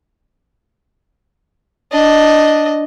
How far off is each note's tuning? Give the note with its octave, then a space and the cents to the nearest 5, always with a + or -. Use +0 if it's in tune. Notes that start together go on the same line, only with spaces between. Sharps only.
D4 +0 D#5 +0